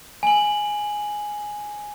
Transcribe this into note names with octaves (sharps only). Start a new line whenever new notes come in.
G#5 F#7